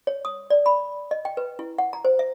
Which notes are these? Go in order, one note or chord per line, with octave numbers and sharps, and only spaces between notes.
C#5
D#6
D5
B5
D#5
G5
B4
E4
F#5
A#5
C5
E5